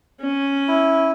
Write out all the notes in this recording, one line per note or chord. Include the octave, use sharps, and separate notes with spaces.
C#4
E4